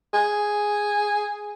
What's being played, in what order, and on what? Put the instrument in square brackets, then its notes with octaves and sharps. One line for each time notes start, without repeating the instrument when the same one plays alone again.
[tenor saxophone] G#4